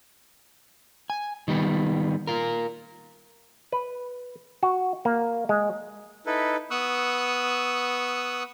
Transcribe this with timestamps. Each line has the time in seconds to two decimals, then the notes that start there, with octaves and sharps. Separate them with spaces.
1.10 G#5
1.48 D#3 G3 B3
2.27 F4 A#4
3.72 B4
4.63 F#4
5.05 A#3
5.49 G#3
6.26 D#4 E4 A4 B4
6.71 B3 C#6 D#6 E6 F#6